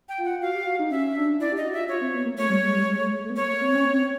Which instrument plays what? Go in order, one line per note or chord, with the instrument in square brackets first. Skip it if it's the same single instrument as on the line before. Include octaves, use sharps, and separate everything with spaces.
[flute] G5
[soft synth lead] F4
[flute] F#5
[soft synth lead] F#4 [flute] F5
[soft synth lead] G4
F#4
D#4
[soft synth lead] C#4 [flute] E5
[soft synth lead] D4
[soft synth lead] E4 [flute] D5
[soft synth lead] G4
[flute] D#5
[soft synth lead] F#4
[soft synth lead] F4 [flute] E5
[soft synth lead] F4 [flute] C#5
[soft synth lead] C4
B3
A#3
[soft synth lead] A3 [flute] C#5
[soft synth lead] G3
G#3
G3
G#3
A3
G#3
A3
B3
[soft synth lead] A#3 [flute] C#5
[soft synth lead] C4
C#4
C4